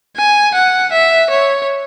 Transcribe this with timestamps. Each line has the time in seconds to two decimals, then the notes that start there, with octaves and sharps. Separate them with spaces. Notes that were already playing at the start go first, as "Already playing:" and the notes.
0.17 G#5
0.55 F#5
0.92 E5
1.30 C#5